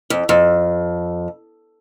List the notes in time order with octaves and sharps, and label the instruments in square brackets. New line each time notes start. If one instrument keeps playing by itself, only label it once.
[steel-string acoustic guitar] F2
F2